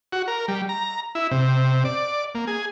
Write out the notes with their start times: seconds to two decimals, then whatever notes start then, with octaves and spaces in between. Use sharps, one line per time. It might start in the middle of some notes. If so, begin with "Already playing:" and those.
0.13 F#4
0.28 A#4
0.48 G3
0.69 A#5
1.15 E4
1.31 C3
1.85 D5
2.35 A#3
2.47 G#4